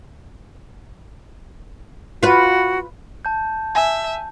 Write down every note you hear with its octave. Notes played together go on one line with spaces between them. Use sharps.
F4 F#4 B4
A5 G6
E5 G#5